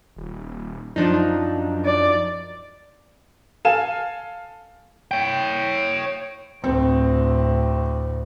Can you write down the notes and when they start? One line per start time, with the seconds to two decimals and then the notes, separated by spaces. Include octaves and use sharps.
0.16 D#1
0.96 F#2 F3 D4 D#4
1.85 D5
3.65 A4 F5 G#5 E7
5.11 C#5 G5
6.64 D2 A2 C4